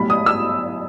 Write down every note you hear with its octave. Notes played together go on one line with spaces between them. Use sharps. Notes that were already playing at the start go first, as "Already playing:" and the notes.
Already playing: B1 A2 G3 B5
D#6
E6